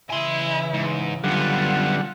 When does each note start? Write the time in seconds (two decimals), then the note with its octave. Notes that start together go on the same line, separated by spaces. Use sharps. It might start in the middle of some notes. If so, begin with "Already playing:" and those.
0.10 C#3 E3 E4 G#5 C6
0.74 G#2
1.24 F#2 D3 G3 B3 F4 F#5